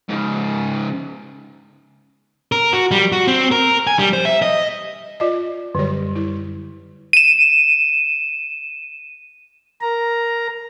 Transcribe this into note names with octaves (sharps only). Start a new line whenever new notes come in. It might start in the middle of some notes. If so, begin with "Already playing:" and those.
G#2 C#3
A#4
F#4
G3
F#4
C4
A#4
G#5
G3
C5
E5
D#5
F4 D5 D#5
F#2 D3 G3 C#5
E4
D#7 E7
A#4 A#5